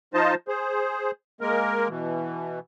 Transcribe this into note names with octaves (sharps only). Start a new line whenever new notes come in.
F3 D#4 F4 C5 D#5 A5
G#4 C5
G#3 A#3 A#4
B2 E3